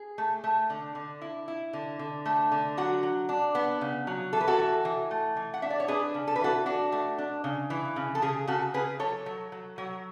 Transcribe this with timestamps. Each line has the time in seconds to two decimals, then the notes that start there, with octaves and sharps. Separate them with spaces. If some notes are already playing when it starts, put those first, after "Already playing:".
Already playing: G#4
0.18 A3
0.44 A3
0.70 D3
0.95 D3
1.21 E4
1.48 E4
1.73 D3
1.99 D3
2.26 A3
2.52 D3
2.77 F#3 F#4
3.03 F#3
3.29 D4
3.55 B3
3.81 C#3
4.07 F#3
4.33 E3 A4
4.41 B4
4.47 F#4 A4
4.59 E3
4.85 E3
5.11 A3
5.37 E3
5.54 F#5
5.62 D4 E5
5.70 D5
5.80 C#5
5.88 D4 G#4 B4
6.14 C#3
6.27 A4
6.36 B4
6.41 E3 F#4 A4
6.66 D4 F#4
6.92 A3
7.18 D4
7.44 C#3
7.70 E3
7.96 C#3
8.15 A4
8.22 C#3 G#4
8.47 C#3 F#4 A4
8.74 C#3 G#4 B4
9.00 F#3 A4 C#5
9.26 F#3
9.52 F#3
9.78 F#3